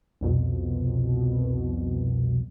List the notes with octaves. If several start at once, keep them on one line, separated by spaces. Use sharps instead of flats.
C2 F2 B2